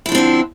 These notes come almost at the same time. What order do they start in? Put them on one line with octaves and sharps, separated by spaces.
E4 F3 D4 C4 D3